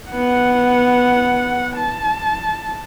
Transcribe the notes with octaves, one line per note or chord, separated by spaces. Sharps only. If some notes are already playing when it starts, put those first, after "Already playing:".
B3 F#5
A5